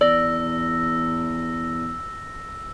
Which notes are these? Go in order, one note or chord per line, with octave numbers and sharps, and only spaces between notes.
E2 D5 E6 A#6